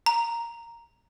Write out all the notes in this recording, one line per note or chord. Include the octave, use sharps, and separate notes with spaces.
A#5